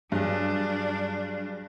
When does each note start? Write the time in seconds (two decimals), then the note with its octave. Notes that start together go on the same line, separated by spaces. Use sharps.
0.12 G2 F#3 D4 G#4